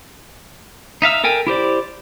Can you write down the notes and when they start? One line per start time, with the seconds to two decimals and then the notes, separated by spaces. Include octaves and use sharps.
1.02 D#4 E5 F5 E6
1.24 A4 A#4 G5 G#5
1.47 E4 G4 C5 D5